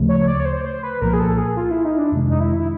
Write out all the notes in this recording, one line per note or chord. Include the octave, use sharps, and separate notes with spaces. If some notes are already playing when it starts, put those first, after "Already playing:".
Already playing: D2 C#3 F3 A3
C#5
D5
C#5
C5
C5
B4
C2 A#2 F3 A#3 A#4
G#4
A4
G#4
F4
E4
D#4
D4
F2 C3 D#3 G#3
D#4
E4
E4